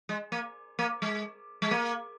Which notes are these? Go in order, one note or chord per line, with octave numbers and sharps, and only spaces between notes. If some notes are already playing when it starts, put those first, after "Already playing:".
G#3
A#3
A#3
G#3
G#3
A#3